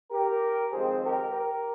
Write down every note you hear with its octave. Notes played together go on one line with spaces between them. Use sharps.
G4 A#4
F2 D#3 G#3 C4 G#4 C5
G4 A#4
G4 A#4